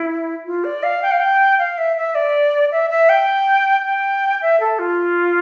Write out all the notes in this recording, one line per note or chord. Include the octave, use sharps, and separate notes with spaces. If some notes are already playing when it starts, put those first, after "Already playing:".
Already playing: E4
F4
D5
F5
G5
F5
G5
F5
E5
E5
D5
E5
E5
G5
G5
E5
A4
F4